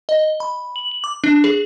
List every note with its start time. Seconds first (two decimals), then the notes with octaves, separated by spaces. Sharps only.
0.09 D#5
0.40 B5
0.76 F#7
0.91 F#7
1.04 D6
1.24 D4
1.44 G#4